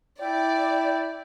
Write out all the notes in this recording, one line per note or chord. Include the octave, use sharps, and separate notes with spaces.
E4 D5 G5